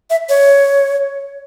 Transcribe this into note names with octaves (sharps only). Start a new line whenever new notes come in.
E5
C#5